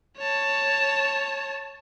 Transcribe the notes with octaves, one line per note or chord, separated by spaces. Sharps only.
C#5 A5